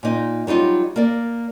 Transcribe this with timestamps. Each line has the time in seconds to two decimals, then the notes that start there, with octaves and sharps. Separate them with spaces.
0.03 A#2 D#4
0.47 F#3 G3 D#4 F4
0.96 A#3 D5